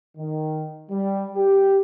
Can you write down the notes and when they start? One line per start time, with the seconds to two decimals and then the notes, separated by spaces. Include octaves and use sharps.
0.18 D#3
0.90 G3
1.36 G4